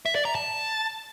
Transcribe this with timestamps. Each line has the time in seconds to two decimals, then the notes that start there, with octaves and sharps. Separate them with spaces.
0.06 E5
0.15 D5
0.25 A#5
0.35 A5